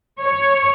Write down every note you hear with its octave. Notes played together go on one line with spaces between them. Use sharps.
C#5